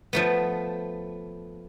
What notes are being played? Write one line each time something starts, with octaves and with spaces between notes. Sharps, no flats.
F3 A3 B3